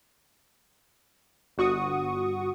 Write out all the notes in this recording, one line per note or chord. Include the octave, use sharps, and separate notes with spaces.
G1 F#4 C#6 D#6